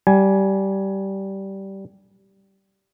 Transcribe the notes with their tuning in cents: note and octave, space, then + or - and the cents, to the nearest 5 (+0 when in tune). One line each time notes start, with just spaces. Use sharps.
G3 -15 G#5 +10